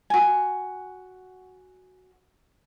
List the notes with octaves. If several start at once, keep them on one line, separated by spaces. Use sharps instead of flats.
F#4 G#5